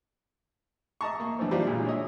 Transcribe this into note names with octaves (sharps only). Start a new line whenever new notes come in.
D#5 E5 A5 A#5 C#6
A#3
F#2 D3 E3 A3 C4
G3 A#3 D4 D#4 F4 G4
A#2 D3 F#3 G#3
C#5 D#5 E5